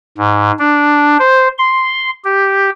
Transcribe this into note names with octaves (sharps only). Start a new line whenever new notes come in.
G#2
D4
C5
C6
G4